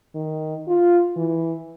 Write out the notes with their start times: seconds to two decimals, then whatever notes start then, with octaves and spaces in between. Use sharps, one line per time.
0.15 D#3
0.68 F4
1.17 E3